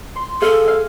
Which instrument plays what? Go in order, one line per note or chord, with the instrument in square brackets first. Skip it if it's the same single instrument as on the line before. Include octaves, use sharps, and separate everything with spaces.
[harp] C6
[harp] G#4 F5 [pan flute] A4
[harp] F5